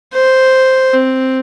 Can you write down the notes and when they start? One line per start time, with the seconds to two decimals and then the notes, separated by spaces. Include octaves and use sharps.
0.14 C5
0.93 C4